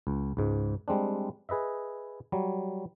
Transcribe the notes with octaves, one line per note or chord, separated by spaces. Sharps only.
C#2
C#2 G#2
G3 G#3 C4 D4
G#4 B4 D#5 E5
F#3 G3